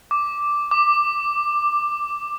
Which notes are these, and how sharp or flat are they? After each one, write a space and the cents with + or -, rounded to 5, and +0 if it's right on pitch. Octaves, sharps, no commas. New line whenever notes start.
D6 +0
D6 +15